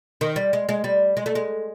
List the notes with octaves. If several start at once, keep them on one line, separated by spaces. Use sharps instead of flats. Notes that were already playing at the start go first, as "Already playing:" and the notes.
D#3
G3
G#3
G#3
G3
G#3
A3
G#3